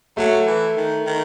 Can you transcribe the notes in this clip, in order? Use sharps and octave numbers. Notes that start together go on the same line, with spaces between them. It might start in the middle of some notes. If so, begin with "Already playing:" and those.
F#3 A3
E3
D#3
D#3